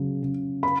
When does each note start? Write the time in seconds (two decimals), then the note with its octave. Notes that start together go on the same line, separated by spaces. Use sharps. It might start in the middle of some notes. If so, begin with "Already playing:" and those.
Already playing: C#3 F#3
0.23 C#3
0.63 B5